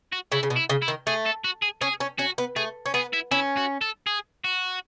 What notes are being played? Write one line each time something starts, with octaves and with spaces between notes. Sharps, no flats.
F#4
C#3 E4
C#3
B2
E4
C#3
E4
D#3
A3 G#4
A4
F#4
G#4
C#4 G#4
C#4
C#4 F#4
B3
A3 G#4
C#4
B3 G#4
E4
C#4 E4
F#4
A4
G#4
F#4